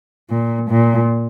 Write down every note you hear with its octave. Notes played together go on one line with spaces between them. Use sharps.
A#2
A#2